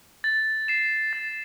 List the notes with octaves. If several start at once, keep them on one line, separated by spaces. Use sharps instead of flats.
A6
C7 E7
A6